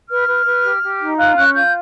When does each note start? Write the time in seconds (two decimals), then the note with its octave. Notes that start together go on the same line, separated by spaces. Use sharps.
0.10 B4 F6
0.28 B4
0.47 B4
0.64 G4
0.82 G4
1.01 D#4
1.19 F4 F#6
1.36 C#4 F#6
1.54 F4 G6